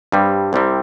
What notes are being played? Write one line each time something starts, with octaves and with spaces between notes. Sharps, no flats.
G2 G3 C4
C2 C3 G3 C4